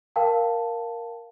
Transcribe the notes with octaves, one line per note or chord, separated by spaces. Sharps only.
A#4 F5 G5 A5